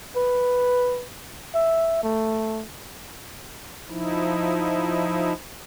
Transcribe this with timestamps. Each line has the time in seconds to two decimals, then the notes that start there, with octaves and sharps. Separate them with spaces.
0.16 B4
1.55 E5
2.03 A3
3.88 F3 D#4 E4